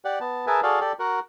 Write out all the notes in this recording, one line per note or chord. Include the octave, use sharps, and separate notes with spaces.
G4 D5 F#5
B3 A5
G#4 A#4 B4 E5 G#5 A5
F#4 G#4 A4 D5 F5
G4 A4 D5
F#4 A#4 F#5